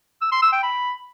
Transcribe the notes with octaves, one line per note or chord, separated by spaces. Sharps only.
E6
C6
E6
G5
B5